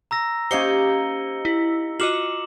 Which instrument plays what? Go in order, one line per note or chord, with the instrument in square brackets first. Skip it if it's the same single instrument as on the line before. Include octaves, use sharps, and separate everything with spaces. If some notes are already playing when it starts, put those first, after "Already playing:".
[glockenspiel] A#5 E6 A#6
[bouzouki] A#3 D#4 G4 [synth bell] C#4 C5 [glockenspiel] C#7 G7
[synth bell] E4
[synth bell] F4 F#4 D#5 [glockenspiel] D6 E7 F#7